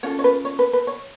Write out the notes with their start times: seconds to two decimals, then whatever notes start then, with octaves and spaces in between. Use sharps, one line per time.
0.03 C#4 F4 A4 C#5
0.19 C#5
0.24 B4
0.45 C#5
0.59 B4
0.73 B4
0.87 C#5